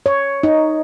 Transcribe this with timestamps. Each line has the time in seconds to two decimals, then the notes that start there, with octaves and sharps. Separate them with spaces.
0.06 C#5
0.43 D#4